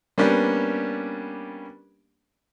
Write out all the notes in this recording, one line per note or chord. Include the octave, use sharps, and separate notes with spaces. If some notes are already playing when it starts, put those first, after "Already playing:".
G3 A#3 B3 C#4 D4 G4